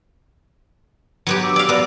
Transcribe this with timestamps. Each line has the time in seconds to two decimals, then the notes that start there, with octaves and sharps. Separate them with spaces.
1.27 F#3 B3 G4
1.43 D6 E6
1.56 D5 F5
1.69 B3 D5 A#5